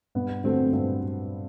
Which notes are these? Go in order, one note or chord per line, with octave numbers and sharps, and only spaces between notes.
G2 B3
D3 F#3 A3 C4
G2 C4